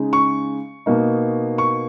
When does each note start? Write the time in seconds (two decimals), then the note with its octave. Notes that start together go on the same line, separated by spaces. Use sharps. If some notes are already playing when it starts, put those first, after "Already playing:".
Already playing: C#3 G#3 D#4
0.13 C#6
0.86 B2 A#3 D#4
1.58 C#6